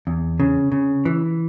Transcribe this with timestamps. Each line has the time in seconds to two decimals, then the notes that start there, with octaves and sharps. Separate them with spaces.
0.07 E2
0.40 C#3
0.72 C#3
1.05 E3